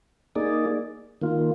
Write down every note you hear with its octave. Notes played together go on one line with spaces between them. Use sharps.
A#3 D#4 G#4 D5
D#3 A#3 F4